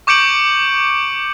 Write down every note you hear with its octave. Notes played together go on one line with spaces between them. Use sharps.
C#6 D6 G6 C#7 D7 F#7